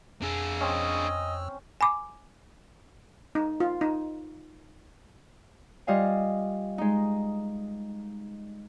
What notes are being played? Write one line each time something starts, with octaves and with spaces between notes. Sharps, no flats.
F2 D4 G#4 E6
C4 C#4 D#5
G#5 B5 D6
D#4
F4
D#4
G3 F4 D#5 F5 G#5
G#3 D#4